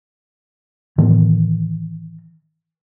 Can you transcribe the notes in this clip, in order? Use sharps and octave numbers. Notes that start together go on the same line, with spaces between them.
A2 D#3 E3 B3